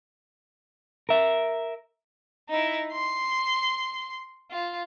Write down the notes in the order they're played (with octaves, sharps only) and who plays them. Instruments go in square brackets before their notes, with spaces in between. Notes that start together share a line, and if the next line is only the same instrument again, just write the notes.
[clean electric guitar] A#4 E5
[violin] D#4 E4
C6
F4